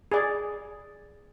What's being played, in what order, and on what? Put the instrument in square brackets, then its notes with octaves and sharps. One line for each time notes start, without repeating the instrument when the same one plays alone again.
[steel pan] G#4 D5